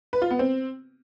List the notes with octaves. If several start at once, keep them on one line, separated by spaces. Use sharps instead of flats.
B4
F4
B3
C4